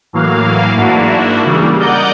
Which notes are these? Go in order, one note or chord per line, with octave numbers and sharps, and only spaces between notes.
A2 E3 F#3 A#3 F5
G#2 A#3 D4 E4 F#4
C#3 E3 G3 A#3
A#4 D5 D#5 F#5 G6